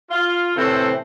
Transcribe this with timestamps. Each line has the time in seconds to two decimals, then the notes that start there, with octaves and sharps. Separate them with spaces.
0.11 F4
0.56 A2 C3 E3 C4 A4 C5